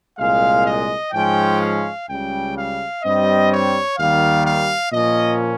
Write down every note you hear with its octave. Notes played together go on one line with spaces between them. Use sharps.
C2 A#2 G#3 F5
D#5
G#2 F3 G#3 C#4 G5
F5
C#2 C#3 G3 G5
F5
G2 G3 C4 D#5
C#5
D#2 D#3 G3 F5
F5
A#2 F3 A#3 C#4 D#5